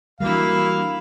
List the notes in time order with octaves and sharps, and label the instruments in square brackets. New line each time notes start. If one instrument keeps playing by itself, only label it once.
[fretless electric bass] E3 G3 [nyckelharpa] A#3 E4 [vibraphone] D4 F#4 A#4 [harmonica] F5